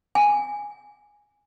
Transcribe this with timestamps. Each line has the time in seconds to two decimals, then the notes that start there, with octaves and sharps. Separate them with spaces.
0.15 G#5